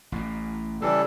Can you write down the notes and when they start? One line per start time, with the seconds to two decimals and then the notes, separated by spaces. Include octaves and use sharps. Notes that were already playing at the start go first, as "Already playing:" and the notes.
0.12 A1 A2
0.82 C#3 E3 G3 A4